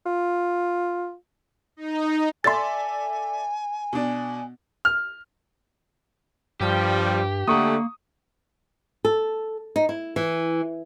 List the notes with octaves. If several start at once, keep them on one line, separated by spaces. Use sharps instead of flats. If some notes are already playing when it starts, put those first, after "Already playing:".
F4
D#4
A4 D5 E5 G#5 C6 A6
B2 D4
F6
G2 F3 G3 G4
D3 A3 A#3 F#5 A#5 C#6 D#6
A4
D#4
E4
E3